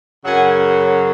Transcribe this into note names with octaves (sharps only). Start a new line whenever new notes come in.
F#2 C#3 F#3 F#5 G#5